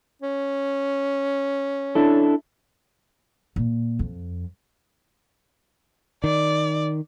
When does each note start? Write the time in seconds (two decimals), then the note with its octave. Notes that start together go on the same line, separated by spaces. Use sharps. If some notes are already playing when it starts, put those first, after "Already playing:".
0.22 C#4
1.95 D4 E4 A4
3.56 A#2
3.99 F2
6.24 D#3 D5